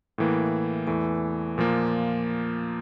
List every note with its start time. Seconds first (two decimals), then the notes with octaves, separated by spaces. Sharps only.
0.18 A2 E3 A#3
0.87 E2 E3 A3
1.58 A#2 F3 A#3